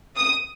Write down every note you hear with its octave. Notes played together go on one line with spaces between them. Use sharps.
D#6